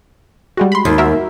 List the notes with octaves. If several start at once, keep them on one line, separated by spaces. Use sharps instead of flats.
G3 G#3 F#4
B5 C6
D#2
F#4 A#4 E5